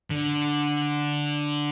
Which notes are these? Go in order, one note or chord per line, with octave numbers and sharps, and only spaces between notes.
D3